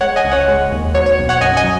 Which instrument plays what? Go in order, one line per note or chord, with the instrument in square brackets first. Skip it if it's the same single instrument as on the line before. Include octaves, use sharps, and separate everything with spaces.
[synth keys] G#3 C#5 F#5
D#5 G#5
C#2
C#5 F#5
G#3
D#2
F#3 C#5
C#5
B1
C#5 F#5
F#2 D#5 G#5
D#5 G#5
F#3